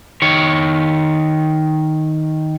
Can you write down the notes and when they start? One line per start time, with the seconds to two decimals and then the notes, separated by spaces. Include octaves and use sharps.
0.22 D#3 C#5